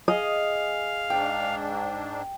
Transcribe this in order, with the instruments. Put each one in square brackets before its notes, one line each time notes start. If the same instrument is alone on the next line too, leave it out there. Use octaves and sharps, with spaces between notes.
[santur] G#4 [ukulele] D#5 [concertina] F5
[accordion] G#2 D4 [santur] G5